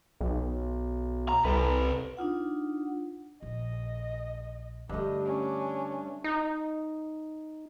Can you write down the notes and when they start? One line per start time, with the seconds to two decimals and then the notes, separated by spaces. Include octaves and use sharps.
0.21 B1
1.29 A#5
1.45 C2 A4 B4
2.17 D4 D#4 F4 F#5
3.43 A#1 D#5
4.89 G2 D3 G3 A3 D#5
5.22 C#4 D4
6.24 D#4